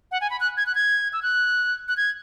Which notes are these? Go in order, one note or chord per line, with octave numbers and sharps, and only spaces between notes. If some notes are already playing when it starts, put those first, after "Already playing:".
F#5
G#5
B5
F#6
G#6
F#6
G#6
E6
F#6
F#6
G#6